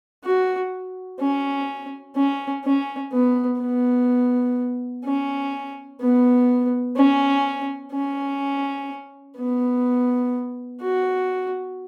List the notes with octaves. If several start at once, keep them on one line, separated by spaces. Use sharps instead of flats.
F#4
C#4
C#4
C#4
B3
B3
C#4
B3
C#4
C#4
B3
F#4